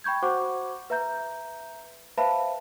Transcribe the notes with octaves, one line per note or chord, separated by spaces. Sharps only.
G5 B5 C#6 G6 G#6
F#4 C5 F#5 C#6 D6
B4 E5 A#5 G6
B4 C5 E5 F5 A5 B5